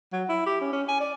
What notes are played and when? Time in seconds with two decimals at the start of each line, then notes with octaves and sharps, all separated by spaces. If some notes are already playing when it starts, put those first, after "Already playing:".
0.12 F#3
0.29 E4
0.46 G4
0.61 C#4
0.72 C#4
0.88 G#5
1.00 D5